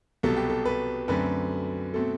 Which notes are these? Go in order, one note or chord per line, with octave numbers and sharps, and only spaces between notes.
C2 B2 F#3 B3 A4
G4
A4
B4
F#2 D3 A3 C4 B4
B2 A3 C4 A4